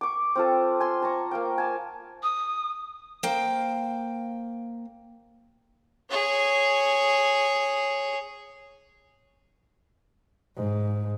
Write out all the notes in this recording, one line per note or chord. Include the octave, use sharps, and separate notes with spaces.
C#6 D6
C4 F4 A4
G#5 C6
A5 A#5 C#6
A#3 F5 G5
G#5 A5
D#6
A#3 C5 F5 G5
G#4 C#5
G#2